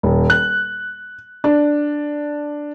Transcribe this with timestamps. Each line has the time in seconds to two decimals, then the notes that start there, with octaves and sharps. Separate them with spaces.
0.03 D#1
0.30 F#6
1.44 D4